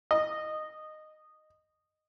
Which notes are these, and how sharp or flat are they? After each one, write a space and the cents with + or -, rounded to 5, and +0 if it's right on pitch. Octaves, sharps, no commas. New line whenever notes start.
D#5 -10